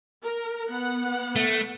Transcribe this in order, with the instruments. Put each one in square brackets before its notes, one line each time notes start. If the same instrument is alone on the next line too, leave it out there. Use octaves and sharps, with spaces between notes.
[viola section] A#4
B3 F#5
[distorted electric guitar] A3